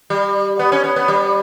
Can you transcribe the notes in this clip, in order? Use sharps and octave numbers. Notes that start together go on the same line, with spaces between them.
G3
B3
C#4
B3
B3
G3